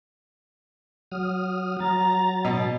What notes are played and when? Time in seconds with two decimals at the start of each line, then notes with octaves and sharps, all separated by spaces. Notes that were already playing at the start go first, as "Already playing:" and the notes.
1.12 F#3 D#6 F6
1.80 F#3 A#5 A6
2.45 B2